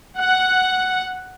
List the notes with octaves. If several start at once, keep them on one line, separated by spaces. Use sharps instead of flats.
F#5